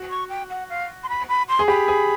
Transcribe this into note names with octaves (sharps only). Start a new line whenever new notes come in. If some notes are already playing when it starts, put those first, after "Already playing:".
Already playing: F#4
C#6
G5
F#5
F5
C6
B5
B5
C6
G#4
G4 B5
G#4